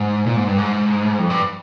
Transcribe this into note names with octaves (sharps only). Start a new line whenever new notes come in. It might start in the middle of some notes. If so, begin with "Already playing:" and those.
Already playing: G#2
A#2
G#2
G2
G#2
F2
G2